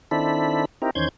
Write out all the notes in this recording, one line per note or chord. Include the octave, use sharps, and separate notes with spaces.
D#3 C4 D4 E4 A4 B5
C4 D#4 E4 G4 A#4
E2 D#3 C#4 C5 G6 G#6